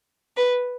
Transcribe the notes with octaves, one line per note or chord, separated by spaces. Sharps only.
B4